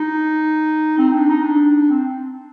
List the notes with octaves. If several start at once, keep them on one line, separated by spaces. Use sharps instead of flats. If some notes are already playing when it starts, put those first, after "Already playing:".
Already playing: D#4
C4
D4
D#4
D4
C4